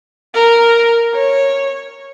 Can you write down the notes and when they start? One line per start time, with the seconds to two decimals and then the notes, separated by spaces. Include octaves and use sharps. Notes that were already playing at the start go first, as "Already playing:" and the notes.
0.34 A#4
1.14 C#5